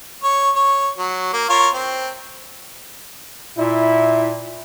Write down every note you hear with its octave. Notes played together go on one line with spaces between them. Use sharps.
C#5
C#5
F#3
A#3
F4 A#4 C#5
C4
A#2 E4